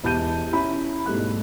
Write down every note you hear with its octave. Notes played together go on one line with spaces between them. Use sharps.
E1 E4 G4 A5 G6 D#7
C#4 E4 A#5 B5
G#2 B2 G3 A3 F#6